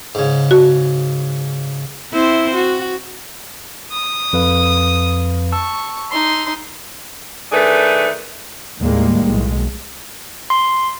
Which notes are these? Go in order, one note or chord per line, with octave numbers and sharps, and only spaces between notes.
G#2 C#3
F#4
C4 E4 C5
F#4
D#6
F2 B4 F5
A5 C#6 E6
D#4 C6
D#3 A3 D4 G#4 B4
D#2 A2 D#3 G3 G#3 A#3
B1 A2 G#3
C6